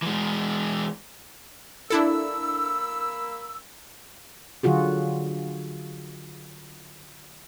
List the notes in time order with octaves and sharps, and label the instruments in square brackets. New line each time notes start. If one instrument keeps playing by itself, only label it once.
[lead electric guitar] E3 G#3
[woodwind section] A#3 B5 E6 [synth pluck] D4 E4 A4
[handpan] D3 F#3 F4 F#4 G#4